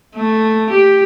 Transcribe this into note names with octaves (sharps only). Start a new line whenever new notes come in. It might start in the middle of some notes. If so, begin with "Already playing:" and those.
A3
G4